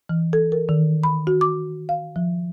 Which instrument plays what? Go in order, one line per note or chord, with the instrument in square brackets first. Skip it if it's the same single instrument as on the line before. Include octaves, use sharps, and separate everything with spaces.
[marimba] E3
A4
A#4
D#3
B5
F#4
D6
F5
F3